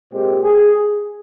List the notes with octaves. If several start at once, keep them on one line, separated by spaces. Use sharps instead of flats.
A#2 G#3 C4 G4
G#4